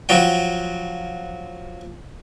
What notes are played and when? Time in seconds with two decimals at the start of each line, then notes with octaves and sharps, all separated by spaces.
0.09 F3 F#3 G5